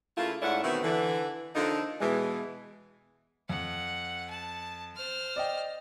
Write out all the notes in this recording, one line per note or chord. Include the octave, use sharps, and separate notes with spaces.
C#3 A3 A#3 E4 F4
G#2 A3 C#4 E4 D5 F#5
B2 D#3 E3 A3 B3 C4
D3 E3
D3 F3 A#3 D4 D#4 A4
B2 E3 G#3
F2 F#5
A5
C5 F6
D5 D#5 G5